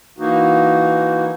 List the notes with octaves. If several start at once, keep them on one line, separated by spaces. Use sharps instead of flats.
E3 A#3 D#4 F#4